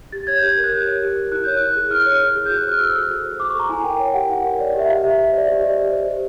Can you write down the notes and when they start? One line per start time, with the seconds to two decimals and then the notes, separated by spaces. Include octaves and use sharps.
0.12 G4 A6
0.27 C#5 G#6
0.38 G4 G6
0.48 G#6
0.57 A#4
0.64 F#6
0.72 G4 G6
0.87 C#5
1.02 G4
1.16 A#4
1.31 E4 F#6
1.44 C#5 G6
1.57 E4 F#6
1.76 G#4
1.91 E4 F6
2.06 C#5 F6
2.21 E4
2.36 G#4
2.46 F#4 G6
2.57 F#6
2.65 C5 F6
2.80 F#4 E6
2.95 A4
3.10 F#4
3.25 C5
3.40 F#4 D6
3.50 C#6
3.54 A4
3.59 A#5
3.69 E4 G#5
3.84 A#4 G5
3.99 C#5 G5
4.14 G4 F#5
4.29 E4
4.44 A#4
4.59 C#5 D5
4.69 D#5
4.74 G4
4.79 E5
4.88 G4 F5
5.03 G4 E5
5.18 C5 E5
5.28 D#5
5.33 C5 D5
5.48 G4 D#5
5.58 D#5
5.63 G4 D5
5.77 C5 D#5
5.93 C5
6.08 G4